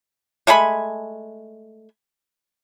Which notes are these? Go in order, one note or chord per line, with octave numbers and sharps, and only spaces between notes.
G#3 A3 G#5 B5